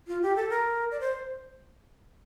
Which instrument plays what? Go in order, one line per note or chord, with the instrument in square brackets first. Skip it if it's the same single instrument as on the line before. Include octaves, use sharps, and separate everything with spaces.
[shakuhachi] F4
G4
A4
A#4
D5
C5